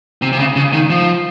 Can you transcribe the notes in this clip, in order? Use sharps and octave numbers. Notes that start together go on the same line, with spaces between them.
C3
C3
C#3
C#3
D#3
F3